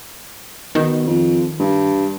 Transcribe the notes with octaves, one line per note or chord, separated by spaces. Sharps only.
B2 D#3
F2
G2